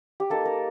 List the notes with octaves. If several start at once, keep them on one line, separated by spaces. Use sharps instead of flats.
G4
A#3 D#4 A4
A#4